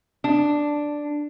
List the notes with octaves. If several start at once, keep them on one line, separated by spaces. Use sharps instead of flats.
D4